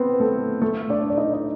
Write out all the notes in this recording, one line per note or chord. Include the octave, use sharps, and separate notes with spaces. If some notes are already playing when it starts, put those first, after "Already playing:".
Already playing: B3 C4 B4
A3 A4
A3 A4
D4 D5
D5
D#4 D#5
D#5